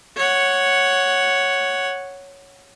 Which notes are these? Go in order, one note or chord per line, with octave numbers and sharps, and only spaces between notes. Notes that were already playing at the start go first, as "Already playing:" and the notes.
C#5 F#5